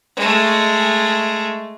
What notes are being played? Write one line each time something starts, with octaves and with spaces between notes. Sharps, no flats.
G#3 A3